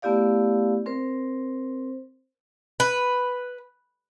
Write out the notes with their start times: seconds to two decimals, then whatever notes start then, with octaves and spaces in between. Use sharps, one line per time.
0.02 A3 B3 E4 G4 D5 F5
0.86 C4 A#4 C5
2.80 B4